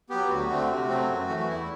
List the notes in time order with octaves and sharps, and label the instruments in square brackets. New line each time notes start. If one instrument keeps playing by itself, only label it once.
[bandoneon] F#3 B3 G4
D2 F#4
D3 A3 C4
C3
F#3 A3 C4
F#2
E3 A3
F#4
E2 E4